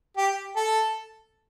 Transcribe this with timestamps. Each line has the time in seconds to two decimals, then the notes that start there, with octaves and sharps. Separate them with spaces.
0.17 G4
0.56 A4